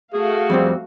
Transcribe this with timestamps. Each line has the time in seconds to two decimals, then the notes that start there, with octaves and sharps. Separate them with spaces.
0.14 A3 F#4 G#4 F5
0.50 F2 G3 C4